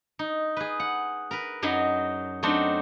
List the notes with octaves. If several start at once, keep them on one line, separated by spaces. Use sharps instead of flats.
D#4
G#4 B4
F#5
A#4 B4
F#2 F#3 D#4 G#5 B5
F#3 A3 C4 D4 D#4